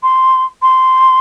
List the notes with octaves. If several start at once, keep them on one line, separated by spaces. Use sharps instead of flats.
C6
C6